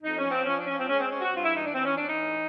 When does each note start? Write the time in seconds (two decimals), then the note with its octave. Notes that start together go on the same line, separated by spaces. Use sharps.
0.03 F2 D#4
0.17 C#4
0.24 F3
0.31 C4
0.46 F3 C#4
0.56 D4
0.67 F3 C#4
0.78 C4
0.89 G#3 C#4
1.00 C4
1.10 C4 C#4
1.21 F#4
1.31 G2 F4
1.43 E4
1.53 E3 D#4
1.64 D4
1.74 E3 C4
1.86 C#4
1.95 E3 D4
2.06 D#4
2.17 A2